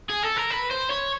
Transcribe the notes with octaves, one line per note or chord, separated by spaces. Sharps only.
G#4
A4
A#4
B4
C5
C#5